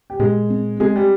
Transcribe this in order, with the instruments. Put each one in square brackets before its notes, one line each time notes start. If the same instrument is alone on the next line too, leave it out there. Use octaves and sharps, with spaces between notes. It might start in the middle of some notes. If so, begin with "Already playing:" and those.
[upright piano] G4
[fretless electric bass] A#2 [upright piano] G#3 G#4
[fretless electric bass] C4
[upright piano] G#3 G#4 [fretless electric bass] C4
[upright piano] G3 G4